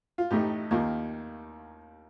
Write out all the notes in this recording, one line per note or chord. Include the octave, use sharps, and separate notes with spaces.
F4
A1 A2 A3 D#4 G4
D#2 D#3 A#3 F4